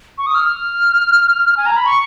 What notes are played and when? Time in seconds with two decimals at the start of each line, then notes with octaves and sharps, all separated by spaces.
0.18 C#6
0.27 D#6
0.35 F6
1.57 G#5
1.66 A#5
1.76 B5
1.85 C#6